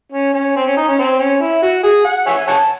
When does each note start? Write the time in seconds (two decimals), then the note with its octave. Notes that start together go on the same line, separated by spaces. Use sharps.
0.12 C#4
0.34 C#4
0.56 C4
0.67 C#4
0.77 D#4
0.88 C#4
0.99 C4
1.19 C#4
1.41 E4
1.62 F#4
1.83 G#4
2.05 F#5
2.27 C#5 E5 G#5
2.47 C#5 F#5 A5